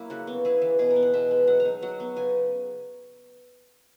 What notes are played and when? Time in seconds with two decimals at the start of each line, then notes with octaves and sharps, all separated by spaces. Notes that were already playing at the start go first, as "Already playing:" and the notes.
Already playing: F#3 A#3 E4
0.10 C#3 F#4
0.27 B3
0.45 E4 G#4
0.62 E3
0.79 B2 G#4
0.91 A#4
0.96 B3
1.02 F#5
1.14 B2 E5
1.31 G#3
1.47 F#3 F#5
1.60 A#5
1.65 D#4
1.82 F#3 F#5
2.00 B3
2.16 C#3 G#5